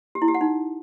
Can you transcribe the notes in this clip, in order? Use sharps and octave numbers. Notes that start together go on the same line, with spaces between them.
G4
E4
G4
F#5
D#4